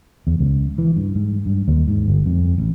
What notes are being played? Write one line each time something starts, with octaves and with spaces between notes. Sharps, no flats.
E2
C#2
E3
G2
G#2
G2
D#2
G#2
G1
F2
A1